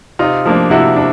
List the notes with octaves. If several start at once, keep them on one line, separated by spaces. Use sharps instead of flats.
C3 D#4 F4
F3 A#3 D4
C3 E4 F#4
D4